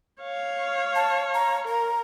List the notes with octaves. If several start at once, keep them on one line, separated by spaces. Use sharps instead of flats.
C#5 F5
A5
A#5
A#4 A#5